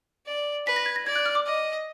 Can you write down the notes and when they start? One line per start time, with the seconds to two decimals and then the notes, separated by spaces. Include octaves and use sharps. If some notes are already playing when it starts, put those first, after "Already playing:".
0.26 D5
0.67 B4 B6
0.76 A#6
0.86 G#6
0.96 A#6
1.06 D5 G#6
1.16 F#6
1.26 F6
1.35 D6
1.46 D#5